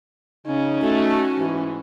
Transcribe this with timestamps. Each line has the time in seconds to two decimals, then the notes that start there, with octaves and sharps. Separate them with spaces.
0.47 C#3 C#4 D#4
0.81 A3 F#4
1.37 G#2 E3